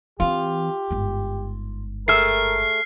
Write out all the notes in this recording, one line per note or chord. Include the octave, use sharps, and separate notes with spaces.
E3 C4 F4 G4
G1 G#2
A3 G#4 A#4 E5 F6 C7